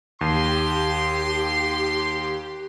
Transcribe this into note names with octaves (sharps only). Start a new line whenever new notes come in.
D#2 G4 C6